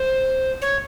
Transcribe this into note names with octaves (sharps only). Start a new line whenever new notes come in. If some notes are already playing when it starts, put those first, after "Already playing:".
Already playing: C5
C#5